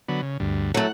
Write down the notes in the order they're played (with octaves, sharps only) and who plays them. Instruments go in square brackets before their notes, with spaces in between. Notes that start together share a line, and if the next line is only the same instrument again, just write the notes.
[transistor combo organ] D3 F#3 B3
C#3
D2 G2
[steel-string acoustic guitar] F#3 A3 [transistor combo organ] F#5